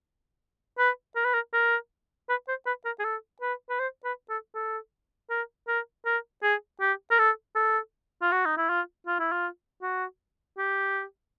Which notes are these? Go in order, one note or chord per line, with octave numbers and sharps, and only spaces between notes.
B4
A#4
B4
A#4
A#4
B4
C5
B4
A#4
G#4
A4
B4
B4
C5
B4
A4
A4
A#4
A#4
A#4
G#4
G4
A#4
A4
A4
F4
F#4
D#4
E4
F4
F4
E4
F4
F#4
G4